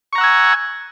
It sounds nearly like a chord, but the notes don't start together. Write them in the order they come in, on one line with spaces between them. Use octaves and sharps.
C#6 A#5 F#5 E6 G#5